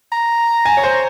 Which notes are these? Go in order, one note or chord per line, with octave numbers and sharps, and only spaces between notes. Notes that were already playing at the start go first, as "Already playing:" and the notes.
A#5
G#5
C#5
C5